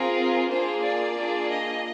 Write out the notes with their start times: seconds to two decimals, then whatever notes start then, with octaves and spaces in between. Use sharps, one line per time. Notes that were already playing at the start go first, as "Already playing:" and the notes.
Already playing: C4 F4 G#4 A#4
0.48 A#3 D4 F4 G#4 C5
0.83 D5
1.16 A#3 D4 F4 G#4
1.50 D#5